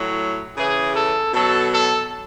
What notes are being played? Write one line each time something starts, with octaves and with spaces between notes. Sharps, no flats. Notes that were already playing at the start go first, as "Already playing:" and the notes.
Already playing: A2 F#3
C#3 E3 G#4
A4
B2 F#3 A4
A4